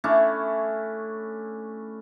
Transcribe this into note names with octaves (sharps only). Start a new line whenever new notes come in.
A3 C#4 D4 E4